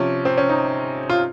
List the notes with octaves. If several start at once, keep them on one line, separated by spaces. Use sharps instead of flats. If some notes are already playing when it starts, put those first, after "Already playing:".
Already playing: C3 F3 C#4
C4
C#4
D#4
F4